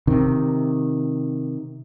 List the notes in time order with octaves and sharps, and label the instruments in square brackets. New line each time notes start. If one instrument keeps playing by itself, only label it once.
[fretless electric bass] C3 D#3